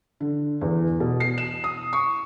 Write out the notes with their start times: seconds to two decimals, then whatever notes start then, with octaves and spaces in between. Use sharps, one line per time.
0.20 D3
0.61 E2
1.00 B2
1.20 C7
1.38 E7
1.64 D#6
1.93 C#6